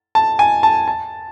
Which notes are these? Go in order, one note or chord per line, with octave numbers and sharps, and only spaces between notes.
A5
G#5
A5
A5